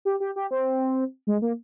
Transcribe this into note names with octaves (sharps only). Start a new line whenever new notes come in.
G4
G4
G4
C4
G#3
A#3